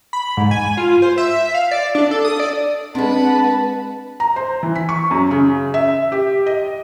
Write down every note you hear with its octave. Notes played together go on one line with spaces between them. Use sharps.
B5
G#2
G#5
F4
C5
E5
F5
D5
D4
A4
D#6
D5
G#3 C4 D4 B4 F#5 A5
A#5
C5
E3
B6
C#6
F#2
C#3
E5
G4
D#5